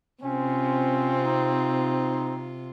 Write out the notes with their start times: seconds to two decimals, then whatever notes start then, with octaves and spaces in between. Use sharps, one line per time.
0.23 C3 C4 C#4 F4
1.25 D#4